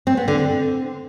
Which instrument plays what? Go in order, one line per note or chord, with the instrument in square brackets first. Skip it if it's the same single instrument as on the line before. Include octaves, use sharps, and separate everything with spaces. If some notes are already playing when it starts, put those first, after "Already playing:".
[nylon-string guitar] C4
B3
D3
C4